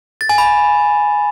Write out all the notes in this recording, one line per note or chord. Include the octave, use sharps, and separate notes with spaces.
A6
G#5
B5